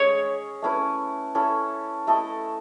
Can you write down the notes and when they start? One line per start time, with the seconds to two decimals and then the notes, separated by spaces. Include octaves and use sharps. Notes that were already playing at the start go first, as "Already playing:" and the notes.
Already playing: C#4 G#4 C#5 D#5
0.62 A3 C#4 E4 B4
1.35 C#4 E4 A4
2.07 A3 E4 A4 D#5